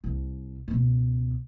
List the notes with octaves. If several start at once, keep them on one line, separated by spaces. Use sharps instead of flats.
C2
C#2 B2